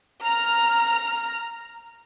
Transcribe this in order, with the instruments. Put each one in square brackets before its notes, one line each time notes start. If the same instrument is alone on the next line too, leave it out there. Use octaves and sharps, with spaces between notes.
[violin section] A#5 F6